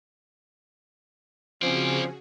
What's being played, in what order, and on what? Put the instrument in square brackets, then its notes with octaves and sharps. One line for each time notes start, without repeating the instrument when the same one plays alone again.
[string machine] C#3 F#4 G#4 [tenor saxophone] F3 [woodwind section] C4 C#4 [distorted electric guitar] C5 D5